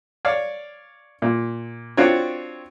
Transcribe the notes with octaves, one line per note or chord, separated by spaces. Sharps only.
C#5 D5 F5
A#2
C4 D4 F4 F#4 C#5